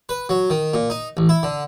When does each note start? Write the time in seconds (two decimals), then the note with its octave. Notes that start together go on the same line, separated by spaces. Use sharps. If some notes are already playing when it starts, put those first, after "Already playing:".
0.09 B4
0.29 F#3
0.50 D#3
0.74 A#2
0.90 D#4
1.17 A1
1.29 E4
1.43 D3